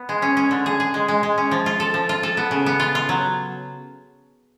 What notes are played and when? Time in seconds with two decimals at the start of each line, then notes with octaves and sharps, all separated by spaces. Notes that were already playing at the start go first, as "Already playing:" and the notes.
Already playing: B3
0.09 G#3
0.22 C#4
0.37 C#4
0.51 D3
0.66 G#4
0.80 G#4
0.94 G#3
1.08 G#3
1.23 G#3
1.38 C#4
1.51 F3
1.66 F4
1.80 A4
1.94 F3
2.09 F4
2.23 A4
2.37 B3
2.51 C#3
2.66 B3
2.80 F4
2.95 F4
3.09 F#3